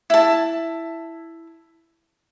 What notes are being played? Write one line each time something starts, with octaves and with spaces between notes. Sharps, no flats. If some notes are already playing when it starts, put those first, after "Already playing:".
E4 A5